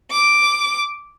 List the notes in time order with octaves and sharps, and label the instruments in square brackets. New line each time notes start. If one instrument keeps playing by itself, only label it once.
[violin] D6